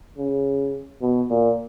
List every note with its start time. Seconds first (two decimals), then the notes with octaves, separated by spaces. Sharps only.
0.18 C#3
1.02 B2
1.30 A#2